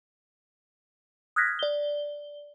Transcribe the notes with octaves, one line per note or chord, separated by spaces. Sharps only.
D#6 F6 F#6 G#6 A#6 B6
D5 G7